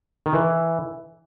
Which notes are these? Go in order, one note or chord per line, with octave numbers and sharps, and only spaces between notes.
D#3
E3